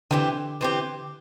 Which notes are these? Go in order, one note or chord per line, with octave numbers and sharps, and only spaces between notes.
D3 E3 C4 G4
E3 C4 G4